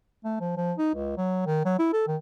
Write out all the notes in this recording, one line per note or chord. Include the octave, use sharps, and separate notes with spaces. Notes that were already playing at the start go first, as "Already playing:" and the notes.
A3
F3
F3
D#4
C#2
F#3
D#3
F#3
E4
A4
D#3